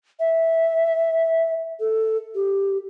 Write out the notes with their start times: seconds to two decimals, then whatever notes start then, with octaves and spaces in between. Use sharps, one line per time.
0.20 E5
1.80 A4
2.35 G4